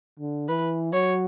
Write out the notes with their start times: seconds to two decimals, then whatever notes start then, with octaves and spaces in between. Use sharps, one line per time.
0.20 D3
0.48 E3 B4
0.93 F#3 C#5